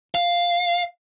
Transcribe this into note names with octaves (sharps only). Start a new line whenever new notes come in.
F5